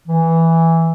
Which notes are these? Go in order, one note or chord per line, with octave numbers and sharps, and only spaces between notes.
E3